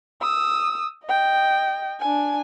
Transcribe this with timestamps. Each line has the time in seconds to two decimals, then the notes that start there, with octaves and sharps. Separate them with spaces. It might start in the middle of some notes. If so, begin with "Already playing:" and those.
0.22 D#6 E6
1.05 D#5 G5
2.00 D4 G#5